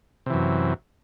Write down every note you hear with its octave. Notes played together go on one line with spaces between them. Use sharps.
F#2 C3 E3